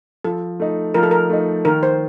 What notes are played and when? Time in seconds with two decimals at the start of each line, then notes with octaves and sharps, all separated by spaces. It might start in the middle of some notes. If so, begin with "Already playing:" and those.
0.25 F3 A4
0.60 A3 D#4
0.94 F3 A#4
1.03 A4
1.11 A#4
1.30 A3 D#4
1.65 D#3 A#4
1.83 C5